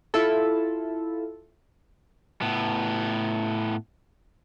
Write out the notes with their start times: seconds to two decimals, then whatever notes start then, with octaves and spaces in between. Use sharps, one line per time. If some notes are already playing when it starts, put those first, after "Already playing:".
0.14 E4 F4 A4
2.42 A2 B3